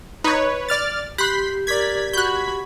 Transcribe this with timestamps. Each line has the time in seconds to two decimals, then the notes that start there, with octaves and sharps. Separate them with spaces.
0.24 D#4 B4 C#5
0.69 D5 F6 A6
1.18 G4 B5 C6 F#6 B6
1.67 A#4 D5 G#6 B6
2.13 F#4 B5 F#6 G6